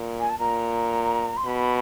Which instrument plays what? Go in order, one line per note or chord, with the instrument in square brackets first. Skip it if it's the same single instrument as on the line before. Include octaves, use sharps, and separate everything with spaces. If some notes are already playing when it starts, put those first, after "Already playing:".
Already playing: [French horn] A#2
[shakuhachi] G#5
A5
[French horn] A#2 [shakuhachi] A#5
[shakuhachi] C6
[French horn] B2 [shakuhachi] B5